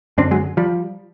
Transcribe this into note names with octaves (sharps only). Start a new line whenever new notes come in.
F#2 D3 C4 D4
F#3 G#3
F3 G3